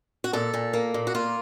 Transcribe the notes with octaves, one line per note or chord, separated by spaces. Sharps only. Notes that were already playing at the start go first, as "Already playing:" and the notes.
F#4
A#2 A4
A#2
A#3
A#2
F#4
A#3 F4